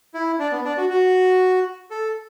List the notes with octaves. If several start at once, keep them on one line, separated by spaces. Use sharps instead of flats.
E4
D4
B3
D4
F#4
F#4
A4